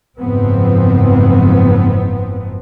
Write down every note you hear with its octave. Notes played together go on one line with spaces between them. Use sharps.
F#1 G#2 F3 B3 C4